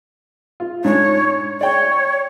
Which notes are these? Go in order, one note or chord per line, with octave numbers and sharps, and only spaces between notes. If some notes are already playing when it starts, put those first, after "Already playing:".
F4
G#2 G#3 D4 C#5
C#5 D5 G5